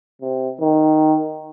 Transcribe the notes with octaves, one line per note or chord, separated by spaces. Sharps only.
C3
D#3